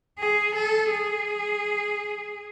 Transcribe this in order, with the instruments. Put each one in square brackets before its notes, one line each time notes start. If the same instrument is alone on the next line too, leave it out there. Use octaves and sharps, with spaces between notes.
[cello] G#4
A4
G#4